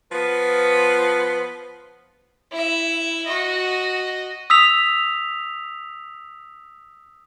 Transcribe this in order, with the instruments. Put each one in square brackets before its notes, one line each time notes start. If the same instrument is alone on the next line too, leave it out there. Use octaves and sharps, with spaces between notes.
[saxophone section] F3 B3 F4 B4
[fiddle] E4 E5
F#4 D#5
[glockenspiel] D#6 E6 B6 F7